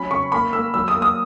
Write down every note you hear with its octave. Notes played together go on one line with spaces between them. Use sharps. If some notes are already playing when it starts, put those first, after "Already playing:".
Already playing: F#3 C#4 B5
C#3 C#6
A#3 B5
A#3 E6
F#3 E6
D#6
A#3
D#6